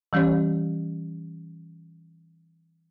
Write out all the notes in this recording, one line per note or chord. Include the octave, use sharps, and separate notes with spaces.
E3 G3 C#4 G4 C#5